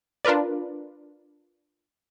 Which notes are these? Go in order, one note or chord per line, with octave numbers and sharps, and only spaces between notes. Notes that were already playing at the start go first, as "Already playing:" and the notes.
D4 F4 A#4 B4 D5